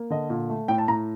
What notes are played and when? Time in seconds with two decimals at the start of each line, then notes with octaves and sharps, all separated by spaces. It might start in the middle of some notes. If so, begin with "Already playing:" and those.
Already playing: A#3
0.10 D3 D#5
0.30 A#2
0.50 A3
0.68 A2 G5
0.78 A5
0.88 A2 A#5